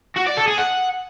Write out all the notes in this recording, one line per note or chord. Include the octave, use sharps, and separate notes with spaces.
F#4
D5
A4
G#4
F#5